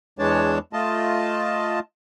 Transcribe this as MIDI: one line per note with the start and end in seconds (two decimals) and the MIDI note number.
0.19 0.58 40
0.19 0.58 52
0.19 0.58 56
0.19 0.58 62
0.19 0.58 73
0.19 0.58 81
0.73 1.79 57
0.73 1.79 65
0.73 1.79 75
0.73 1.79 81